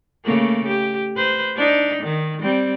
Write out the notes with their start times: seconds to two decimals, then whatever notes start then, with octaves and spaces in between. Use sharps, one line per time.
0.24 C#3 A3 A#3
0.67 G4
1.17 B4 C5
1.56 D4 D#4
2.03 D#3
2.42 G3 C4